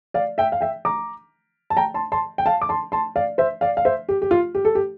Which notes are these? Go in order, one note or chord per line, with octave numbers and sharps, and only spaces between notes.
D5 F5
E5 G5
F5
E5 G5
A#5 D6
A5
G5 A#5
A5 C6
A5 C6
G5
F5 A5
D6
A5 C6
A5 C6
D5 F5
C5 E5
D5 F5
F5
C5 E5
G4
G4
F4
G4
A4
G4